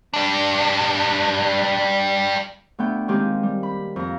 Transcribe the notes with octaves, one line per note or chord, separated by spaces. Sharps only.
G3 D4
D2 B3 G5
D#3 G#3 A#3 C4 D#4 G4
G3
B5
F2 A#5